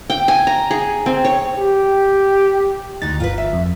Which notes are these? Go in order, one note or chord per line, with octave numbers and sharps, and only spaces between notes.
G5
G#5
A#5
G#4
C4
C#5
G4
D2 D#4 F#4 A6
G1 F4 A#4 B4
E5
F2